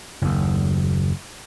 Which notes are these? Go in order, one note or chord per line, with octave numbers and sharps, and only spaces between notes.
F#1 D#2